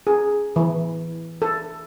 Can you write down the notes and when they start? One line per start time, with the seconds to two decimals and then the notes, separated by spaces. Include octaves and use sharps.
0.07 G#4
0.56 E3
1.42 A4